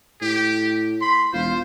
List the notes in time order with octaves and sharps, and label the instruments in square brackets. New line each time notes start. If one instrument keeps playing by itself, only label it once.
[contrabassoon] A2 [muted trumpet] G4
[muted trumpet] B5 [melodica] C6
[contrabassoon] E1 [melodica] F4 [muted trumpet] C5